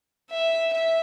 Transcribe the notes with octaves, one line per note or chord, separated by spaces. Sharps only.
E5
E5